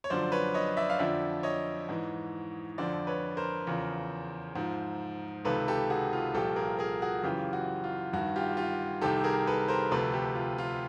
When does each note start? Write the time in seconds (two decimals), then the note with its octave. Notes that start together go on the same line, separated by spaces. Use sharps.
0.04 C#5
0.10 F#2 D3 F3 C5 D5
0.32 B4 C#5
0.54 C#5 D#5
0.77 D5 E5
0.90 F5
0.99 F2 D3 F3 D5 E5
1.43 C#5 D#5
1.89 G#2 E3
2.78 F2 D3 F3 C5 D5
3.07 B4 C#5
3.37 A#4 C5
3.67 E2 C#3 F3
4.56 G#2 F3
5.45 C#2 C3 D#3 A4 B4
5.68 G4 A4
5.90 F#4 G#4
6.13 F4
6.34 C2 A#2 F3 G4 A4
6.56 G#4 A#4
6.79 G#4 A#4
7.02 F#4 G#4
7.23 F#2 C#3 E3 F4 G4
7.53 F#4
7.84 F4
8.13 G2 D#3 F#4
8.36 F4 G4
8.57 F4 G4
9.02 C2 C3 D#3 G4 A4
9.24 G#4 A#4
9.47 A4 B4
9.68 A#4 C5
9.91 D2 C3 F3 A4 B4
10.13 G4 A4
10.35 F4
10.58 F4